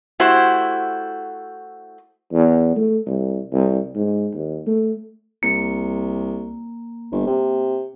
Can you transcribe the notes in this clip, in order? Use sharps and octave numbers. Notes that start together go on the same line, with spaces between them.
A3 E4 F#4 G4 C5
E2
A3
C2
C2
G#2
D#2
A3
C2 A#3
G1
C3